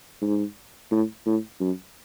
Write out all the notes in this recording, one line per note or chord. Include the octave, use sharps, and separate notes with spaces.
G#2
A2
A2
F#2